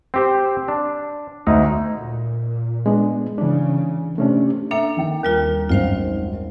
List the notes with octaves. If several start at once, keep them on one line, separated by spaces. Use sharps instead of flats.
C4 G4 C5
D4
D2 D#4
A#2
G#3 B3 D4
C#3 E3 D4
C3 A3 C#4 D4
A#3 D4 A4 E5
D#3 G5
D#2 G3 F4 A#4
G#1 F#2 F4 C5 F5